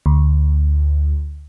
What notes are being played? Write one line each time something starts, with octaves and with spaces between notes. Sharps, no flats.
D2